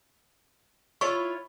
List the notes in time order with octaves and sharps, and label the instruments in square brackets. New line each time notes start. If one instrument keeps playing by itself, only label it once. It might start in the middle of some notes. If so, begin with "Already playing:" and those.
[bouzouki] E4 F4 C#5 [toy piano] C#6